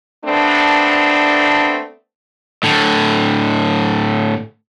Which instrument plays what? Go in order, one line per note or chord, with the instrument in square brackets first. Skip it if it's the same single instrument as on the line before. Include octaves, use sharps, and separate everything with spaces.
[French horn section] A3 B3 C4 D4
[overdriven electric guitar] A2 D3